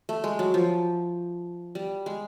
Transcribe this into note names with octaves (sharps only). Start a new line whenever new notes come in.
A3
G#3
F#3
F3
G3
G#3